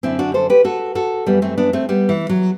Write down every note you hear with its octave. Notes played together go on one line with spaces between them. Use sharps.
F#2 D3 C4 E4
D4 F#4
A4 C5
G4 B4
F#4 A4
F#4 A4
F#2 E3 G3 B3
A3 C4
B3 D4
A3 C4
G3 B3
E3
F#3